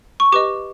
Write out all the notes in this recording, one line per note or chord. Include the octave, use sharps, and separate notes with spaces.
C#6
G4 B4 D#5 D6